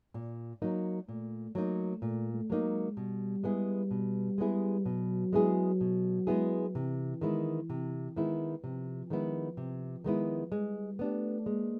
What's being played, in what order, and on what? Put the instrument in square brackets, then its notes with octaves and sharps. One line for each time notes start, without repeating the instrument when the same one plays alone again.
[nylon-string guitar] A#2
F#3 A#3 D#4
[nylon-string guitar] A#2 [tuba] A3
[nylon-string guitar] F#3 A#3 D#4 [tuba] A3
[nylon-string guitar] A#2 [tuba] A3
[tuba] A3
[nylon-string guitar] F#3 A#3 D#4
[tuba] G#3
[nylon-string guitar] B2 [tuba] G3
[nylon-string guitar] G#3 B3 E4 G#4
B2
G#3 B3 E4 G#4
[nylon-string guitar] B2 [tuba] F#3
[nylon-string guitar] G#3 B3 E4 G#4
B2
G#3 B3 E4 G#4
[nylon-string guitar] C3 [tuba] E3
[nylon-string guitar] D#3 G#3 B3 E4
C3
D#3 G#3 B3 E4
[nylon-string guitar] C3 [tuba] F3
[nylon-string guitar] D#3 G#3 B3 E4
C3
D#3 G#3 B3 E4
[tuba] G3 [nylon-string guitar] G#3
[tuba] A3 [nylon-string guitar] B3 D4 G4
[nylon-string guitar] G#3 [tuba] A#3